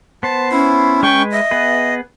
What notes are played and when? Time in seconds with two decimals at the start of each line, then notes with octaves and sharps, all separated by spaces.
0.23 B3 C5 A5
0.52 C#4 E4
1.03 G#3 B4 G5 C#6
1.32 D#5 E5
1.51 B3 G#4 B4